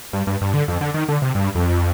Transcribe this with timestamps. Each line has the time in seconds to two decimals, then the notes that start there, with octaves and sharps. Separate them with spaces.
0.13 G2
0.27 G2
0.41 G2
0.54 D3
0.68 F2
0.81 D3
0.94 D#3
1.08 D3
1.22 C3
1.35 G2
1.55 F2